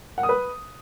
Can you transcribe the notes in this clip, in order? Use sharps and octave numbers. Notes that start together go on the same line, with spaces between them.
F#5
D#6
B4